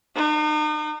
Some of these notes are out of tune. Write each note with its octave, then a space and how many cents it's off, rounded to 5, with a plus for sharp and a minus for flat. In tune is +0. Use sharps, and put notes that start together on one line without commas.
D#4 -40